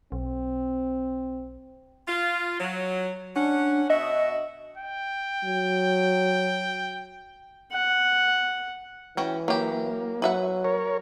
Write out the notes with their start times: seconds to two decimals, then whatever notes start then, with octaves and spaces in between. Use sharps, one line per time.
0.12 B1 C4
2.08 F4
2.60 F#3
3.36 C#4 D4 F#5
3.90 B2 F#4 D#5 E5
4.78 G5
5.44 F#3
7.72 F#5
9.17 E3 C#4 F#4 G5
9.48 F#3 A#3 G4
10.22 F#3 B4 E5 F#5
10.64 A#4 C#5